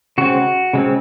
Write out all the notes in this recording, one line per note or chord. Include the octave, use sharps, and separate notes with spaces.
C#3 G#3 C4 F#4
C#3 G#3 C4